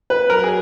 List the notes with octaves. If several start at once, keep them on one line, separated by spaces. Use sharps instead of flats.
B4
F#3 A#4
G#4